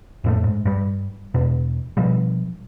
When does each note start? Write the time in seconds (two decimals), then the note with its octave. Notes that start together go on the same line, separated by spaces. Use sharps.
0.24 F2 A2 A3
0.44 G#2
0.65 G2 G3
1.34 E2 B2
1.97 B2 F3 G3